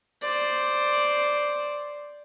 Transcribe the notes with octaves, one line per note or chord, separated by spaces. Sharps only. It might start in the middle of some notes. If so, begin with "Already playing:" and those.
C5 D5